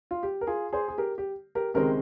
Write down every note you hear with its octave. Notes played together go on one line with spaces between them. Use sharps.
F4
G4
A#4
F4 G#4
G#4 C5
G#4
G4 A#4
G4
G4 A#4
C#2 C3 D#3 G#3 C4 G4 A#4